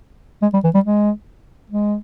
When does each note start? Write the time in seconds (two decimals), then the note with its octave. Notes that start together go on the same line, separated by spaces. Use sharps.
0.42 G#3
0.53 G3
0.64 E3
0.74 G3
0.85 G#3
1.70 G#3